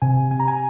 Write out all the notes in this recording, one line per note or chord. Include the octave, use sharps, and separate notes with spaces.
C3 G#5
C3 G#5
A#5
G#5